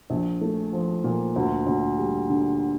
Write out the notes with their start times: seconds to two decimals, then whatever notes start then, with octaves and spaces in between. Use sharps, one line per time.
0.10 A#1
0.41 A3
0.73 F3
1.04 A#2
1.36 D2
1.66 D2
1.98 G3
2.29 D3